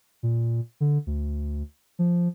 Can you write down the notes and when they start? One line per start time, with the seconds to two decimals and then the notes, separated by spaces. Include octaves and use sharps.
0.23 A#2
0.80 D3
1.07 D2
1.99 F3